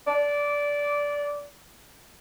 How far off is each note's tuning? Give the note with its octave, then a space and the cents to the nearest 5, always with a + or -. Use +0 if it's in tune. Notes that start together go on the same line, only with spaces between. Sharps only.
D5 -15